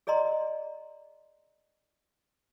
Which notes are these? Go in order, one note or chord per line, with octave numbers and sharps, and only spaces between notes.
G#4 D5 D#5 A#5 C6